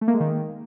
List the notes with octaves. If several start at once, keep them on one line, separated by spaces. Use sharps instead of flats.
A3
A#3
G#3
D#3